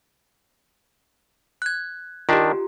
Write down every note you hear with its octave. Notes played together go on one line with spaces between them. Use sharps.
F#6 G#6
D#3 D4 F4 G4